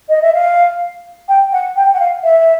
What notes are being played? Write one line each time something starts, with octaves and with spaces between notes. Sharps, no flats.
D#5
E5
F5
G5
F#5
G5
F#5
F5
E5